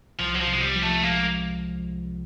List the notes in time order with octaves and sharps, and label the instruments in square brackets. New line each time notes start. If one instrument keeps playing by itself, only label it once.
[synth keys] C2 [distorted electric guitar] F3
[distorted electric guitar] F#3
F3
[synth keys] C3
[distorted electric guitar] G#3
G3
[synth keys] F3
[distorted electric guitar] A3
[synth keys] G#3 [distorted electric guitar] A#3